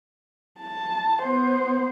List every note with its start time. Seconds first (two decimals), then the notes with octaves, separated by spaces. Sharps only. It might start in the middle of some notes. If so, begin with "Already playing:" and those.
0.61 A5
1.22 B3 C5